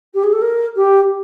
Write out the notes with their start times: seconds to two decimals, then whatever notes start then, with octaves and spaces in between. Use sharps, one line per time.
0.14 G4
0.23 G#4
0.32 A4
0.42 A#4
0.76 G4